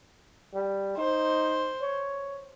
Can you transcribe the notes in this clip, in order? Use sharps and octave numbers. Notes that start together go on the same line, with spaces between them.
G3
D#4 C5
C#5